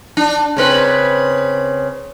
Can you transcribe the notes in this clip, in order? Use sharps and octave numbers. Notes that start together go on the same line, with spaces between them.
D4
C#3 C4 B4